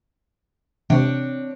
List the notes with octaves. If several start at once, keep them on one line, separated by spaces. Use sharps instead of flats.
C3 C4 D4 C#5